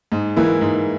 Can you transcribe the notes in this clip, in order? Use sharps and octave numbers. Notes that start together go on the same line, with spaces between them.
G#2
E3 A#3 E4
G#2